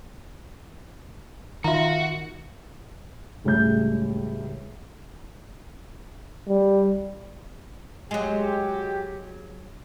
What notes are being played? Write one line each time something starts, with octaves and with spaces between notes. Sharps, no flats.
D#3 F4 F#4 E5 A#5
E1 C#2 A2 G3 G6
G3
F#3 G#3 F#4 G4